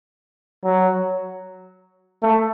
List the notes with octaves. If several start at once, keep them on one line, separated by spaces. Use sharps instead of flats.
F#3
A3